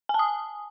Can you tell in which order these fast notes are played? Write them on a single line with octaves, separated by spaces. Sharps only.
G#5 A5 D#6